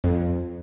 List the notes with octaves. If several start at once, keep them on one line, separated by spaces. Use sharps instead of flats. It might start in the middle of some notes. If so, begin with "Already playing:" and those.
F2